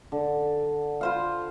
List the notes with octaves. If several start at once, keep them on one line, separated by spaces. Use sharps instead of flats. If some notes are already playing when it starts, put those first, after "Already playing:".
D3
F4 C5 F5